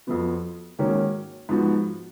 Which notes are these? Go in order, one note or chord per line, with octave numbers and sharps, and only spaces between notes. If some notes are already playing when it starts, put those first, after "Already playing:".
F2 F3 B3 F#4
G#2 D#3 A#3 C#4 F#4
G#2 F3 B3 F#4